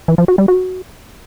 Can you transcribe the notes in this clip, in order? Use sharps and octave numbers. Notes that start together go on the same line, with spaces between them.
E3
F3
F#4
G3
F#4